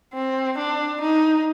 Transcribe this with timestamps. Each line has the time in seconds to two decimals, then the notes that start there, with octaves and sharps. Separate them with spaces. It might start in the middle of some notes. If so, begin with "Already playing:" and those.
0.14 C4
0.58 D4
1.01 D#4